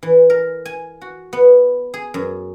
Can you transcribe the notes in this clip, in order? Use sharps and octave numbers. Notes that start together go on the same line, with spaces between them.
E3
A#4
G#5
F#4
B3
G#4
F#2